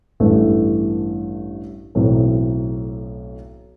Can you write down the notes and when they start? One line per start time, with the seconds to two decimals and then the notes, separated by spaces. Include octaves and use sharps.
0.20 A1 G2 E3 A3 D4
1.95 B1 A2 E3 A3 C4